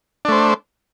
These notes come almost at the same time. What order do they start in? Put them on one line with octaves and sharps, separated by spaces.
D4 A3 C5